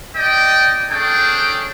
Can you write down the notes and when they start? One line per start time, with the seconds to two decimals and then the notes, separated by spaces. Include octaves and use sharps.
0.16 D5 D#5 G5
0.91 C#4 D4 G#4 A4 G5